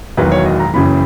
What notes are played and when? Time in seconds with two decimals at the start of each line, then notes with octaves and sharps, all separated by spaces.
0.17 E1 E2 D#3 F#3 B4
0.32 C#5
0.46 D#5
0.60 A#5
0.74 F#1 F#2 C#3 E3 B5